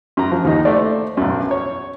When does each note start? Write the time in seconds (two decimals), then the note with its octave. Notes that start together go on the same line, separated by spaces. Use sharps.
0.17 F#2 A#5
0.32 F3
0.44 D#2 D#4
0.65 A3 C5 D5
1.17 B1 F#2
1.51 C#5